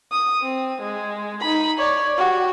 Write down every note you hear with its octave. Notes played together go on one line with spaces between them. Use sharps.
D#6
C4
G#3
D#4 B5
C#5 D5
F#4 G4